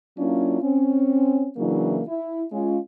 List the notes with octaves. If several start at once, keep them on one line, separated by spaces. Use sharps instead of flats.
F#3 A#3 C#4 D4 E4 F4
C4 C#4
C#3 E3 F#3 A#3 D4 E4
E4
G#3 C#4 F4